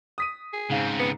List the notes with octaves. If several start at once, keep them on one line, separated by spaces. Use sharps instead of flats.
D#6 B6 D#7
G#4
G#2 C#3 C4 F5
B3